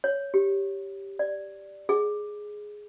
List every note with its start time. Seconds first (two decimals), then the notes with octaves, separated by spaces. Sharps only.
0.04 C#5
0.34 G4
1.19 D5
1.89 G#4